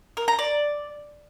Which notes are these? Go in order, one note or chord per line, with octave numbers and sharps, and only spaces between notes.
A#4
A#5
D5